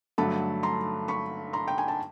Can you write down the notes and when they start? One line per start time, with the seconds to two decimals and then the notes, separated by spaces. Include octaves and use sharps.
0.18 G2 D3 F#3 A3 A5 B5
0.63 A#5 C6
1.08 B5 C#6
1.53 A#5 C6
1.68 G5
1.78 G#5
1.88 A5